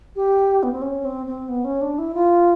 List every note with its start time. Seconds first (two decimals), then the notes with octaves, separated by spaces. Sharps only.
0.16 G4
0.63 B3
0.72 C4
0.82 C#4
1.05 C4
1.26 C4
1.48 B3
1.65 C#4
1.81 D4
1.98 E4
2.15 F4